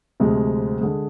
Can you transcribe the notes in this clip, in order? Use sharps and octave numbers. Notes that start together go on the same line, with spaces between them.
D2 C3 F3 G#3
D3 G#3